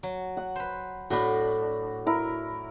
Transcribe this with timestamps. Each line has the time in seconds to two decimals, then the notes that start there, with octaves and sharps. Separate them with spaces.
0.03 F#3
0.37 F#5
0.56 B4 C5
1.10 A2 D4 F#4 B5
2.07 E4 A#4